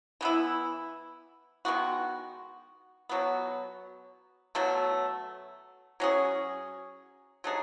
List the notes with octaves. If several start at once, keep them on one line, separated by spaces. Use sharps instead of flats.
E3 B3 E4
D#3 G#3 B3 F#4
B2 F#3 B3
B2 F#3 A3
F#3 C#4 G#4
F#3 A3 D#4 G#4